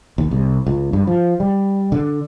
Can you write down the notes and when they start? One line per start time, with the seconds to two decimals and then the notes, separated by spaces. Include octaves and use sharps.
0.18 D#2
0.31 C2
0.67 C#2
0.93 G2
1.07 F3
1.40 G3
1.92 D3